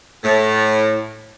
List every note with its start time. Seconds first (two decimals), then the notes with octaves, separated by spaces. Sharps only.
0.24 A2